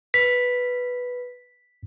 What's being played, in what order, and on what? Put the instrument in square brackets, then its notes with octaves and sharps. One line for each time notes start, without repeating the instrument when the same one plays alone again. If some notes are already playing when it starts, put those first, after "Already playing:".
[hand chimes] B4 [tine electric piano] B6